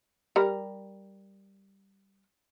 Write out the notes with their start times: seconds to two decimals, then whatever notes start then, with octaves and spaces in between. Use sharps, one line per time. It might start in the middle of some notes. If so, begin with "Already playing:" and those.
0.36 G3 A#4